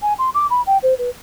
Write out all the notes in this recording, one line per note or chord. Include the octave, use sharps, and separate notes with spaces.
G#5
C6
D6
B5
G5
C5
B4